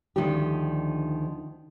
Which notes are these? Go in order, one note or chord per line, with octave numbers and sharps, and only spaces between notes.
D2 G#2 D#3 F3 D4 G4